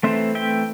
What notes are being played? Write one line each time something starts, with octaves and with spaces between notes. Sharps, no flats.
E3 A3 C4 C5 E5
E5 G5